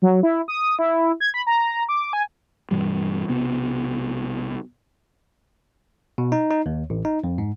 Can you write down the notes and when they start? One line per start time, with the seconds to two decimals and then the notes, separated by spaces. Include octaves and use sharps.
0.02 F#3
0.23 E4
0.48 D#6
0.79 E4
1.20 G#6
1.34 B5
1.47 A#5
1.89 D6
2.13 G#5
2.71 G2 B2 E3 G3
3.29 B1 C3 B3
6.18 B2
6.32 D#4
6.51 D#4
6.66 D#2
6.90 A1
7.05 D#4
7.24 F2
7.38 G#2